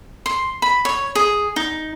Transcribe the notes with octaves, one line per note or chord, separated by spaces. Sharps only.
C6
B5
C#5
G#4
D#4